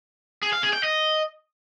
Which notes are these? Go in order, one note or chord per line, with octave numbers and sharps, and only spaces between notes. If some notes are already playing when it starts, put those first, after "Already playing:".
G#4
F5
G#4
G5
D#5